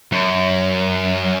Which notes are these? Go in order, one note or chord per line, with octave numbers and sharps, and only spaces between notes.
F#2